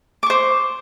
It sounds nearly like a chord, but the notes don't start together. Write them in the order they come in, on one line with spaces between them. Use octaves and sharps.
D6 C#6 C5